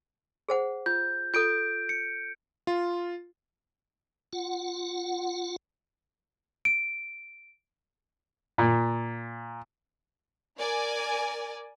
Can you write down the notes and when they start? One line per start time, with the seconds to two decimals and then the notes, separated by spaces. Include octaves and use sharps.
0.49 G#4 C5 F#5
0.86 F4 G6
1.34 F4 A4 G6 D7
1.89 C#7
2.67 F4
4.33 F4 F#5
6.65 D7
8.58 A#2
10.58 A#4 D5 G#5